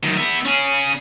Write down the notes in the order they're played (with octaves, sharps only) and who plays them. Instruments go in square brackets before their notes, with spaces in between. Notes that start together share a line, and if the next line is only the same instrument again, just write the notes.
[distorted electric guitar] F#2 D#3
B3 E5
C#4 G#4